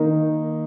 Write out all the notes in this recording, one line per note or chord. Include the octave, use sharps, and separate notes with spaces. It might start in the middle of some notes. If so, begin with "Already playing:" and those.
Already playing: D#3 A#3 D#4